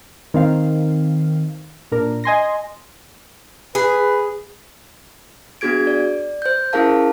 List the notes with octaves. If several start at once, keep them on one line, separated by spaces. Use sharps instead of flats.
D#3 C4 F5
A#2 D4 A#4
D#5 G#5 C6 A#6
G#4 B4
B3 D4 F#4 G#4 G#6 D7
D5
C5 G6
C#4 E4 G#4 A#4 F5 A5